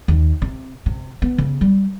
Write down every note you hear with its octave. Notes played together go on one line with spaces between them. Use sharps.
D#2
C3
C3
B3
C#3
G3